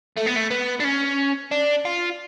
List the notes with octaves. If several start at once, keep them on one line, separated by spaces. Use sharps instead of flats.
A3
B3
A3
B3
D4
C#4
D4
F4